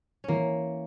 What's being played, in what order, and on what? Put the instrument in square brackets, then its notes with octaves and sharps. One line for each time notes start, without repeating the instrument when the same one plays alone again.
[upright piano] E3 [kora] A#3 C#4